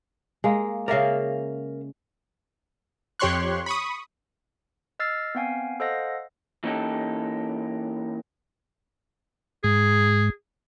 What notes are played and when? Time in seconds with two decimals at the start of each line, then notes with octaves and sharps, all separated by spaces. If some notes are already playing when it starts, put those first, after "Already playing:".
0.44 G#3 A#3
0.88 C#3 A#4 D5 E5 F5
3.19 F2 G4 C#5 C6 C#6 F#6
3.66 B5 C#6 D#6
4.99 D#5 E6 F6 A6 C7
5.35 B3 C4 F5 G5 G#5
5.80 A4 C5 D#5 F5 F#5 A#6
6.64 E3 A#3 C#4 D#4 G4 A4
9.64 G#2 G#4